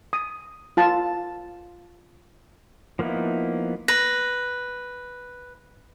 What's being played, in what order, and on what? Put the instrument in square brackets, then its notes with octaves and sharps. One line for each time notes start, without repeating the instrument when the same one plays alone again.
[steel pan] D#6
F4 A5
[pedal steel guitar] F3 A#3 B3 D#4 E4
[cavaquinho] B4 [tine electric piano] A#6